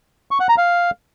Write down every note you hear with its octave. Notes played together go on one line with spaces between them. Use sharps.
C#6
F#5
A#5
F5